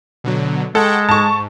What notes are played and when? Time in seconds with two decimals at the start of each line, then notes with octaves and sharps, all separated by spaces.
0.24 B2 D3 F#3
0.75 G#3 A4 F#5 G5 C#6
1.09 G#2 A5 C#6